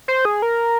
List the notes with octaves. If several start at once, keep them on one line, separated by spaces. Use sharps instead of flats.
C5
G#4
A#4